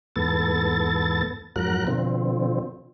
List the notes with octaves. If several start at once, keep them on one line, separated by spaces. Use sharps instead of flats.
E2 G#2 B3 A4 A6
F2 G#2 F#3 A#4 F#6
B2 D3 F3 C4